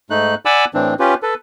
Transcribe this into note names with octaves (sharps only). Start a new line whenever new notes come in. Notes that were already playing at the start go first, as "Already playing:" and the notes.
G#2 A3 D#4 F#6
D5 F#5 G#5 B5 D6 E6
A2 E3 C4 D4
C#4 F4 G4 B4
A4 B4